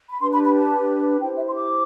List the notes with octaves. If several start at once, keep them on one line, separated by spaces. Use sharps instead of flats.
B5
D4 G4 B4 C6
B5
B5
A5
E4 G4 C5 G5
E5
C6
D6